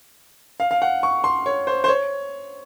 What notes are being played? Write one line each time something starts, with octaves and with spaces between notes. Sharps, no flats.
F5
F5
F#5
C#6
C6
C#5
C5
C5
C#5